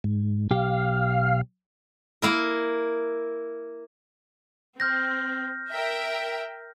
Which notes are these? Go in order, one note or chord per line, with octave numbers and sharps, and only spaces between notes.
G#2
B1 G4 F5
A#3 E4 A#4
C4 F6 G6 A#6
A#4 E5 G5